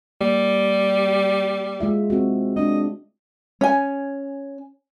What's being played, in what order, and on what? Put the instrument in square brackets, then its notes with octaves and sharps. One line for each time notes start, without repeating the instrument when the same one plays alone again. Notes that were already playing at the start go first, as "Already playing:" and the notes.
[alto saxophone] G3 [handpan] A#3
[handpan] G#3 F4 E5
C4 F#4
[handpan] G#3 D4 [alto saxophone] D#5
[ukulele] C#4 G#5